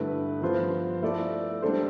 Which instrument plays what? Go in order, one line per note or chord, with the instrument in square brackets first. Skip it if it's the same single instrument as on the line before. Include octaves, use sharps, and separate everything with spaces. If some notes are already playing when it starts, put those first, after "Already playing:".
Already playing: [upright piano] G2 D3 A3 E4 B4
G2 F3 B3 F4 C5
A3 E4 A4 D5
G3 D4 A4 C5